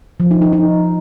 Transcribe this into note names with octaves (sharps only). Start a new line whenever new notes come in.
F3
D#4
D#4
D#4